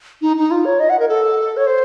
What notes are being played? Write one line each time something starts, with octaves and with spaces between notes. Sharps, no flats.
D#4
D#4
F4
C#5
D#5
F#5
A#4
A4
C#5
C5